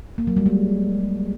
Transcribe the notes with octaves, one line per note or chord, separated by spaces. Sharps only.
A#3
F#3
G3
G#3